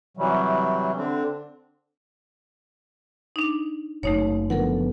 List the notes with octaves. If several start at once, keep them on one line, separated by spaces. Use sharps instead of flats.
C3 E3 F#3 G3
D3 C4 D4
D4 D#4
F#1 A3 D#4 C#5
D3 F3 B3 A4 A#4 F#5